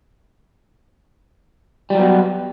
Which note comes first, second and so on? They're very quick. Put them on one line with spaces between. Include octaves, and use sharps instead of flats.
G3 F#3 B3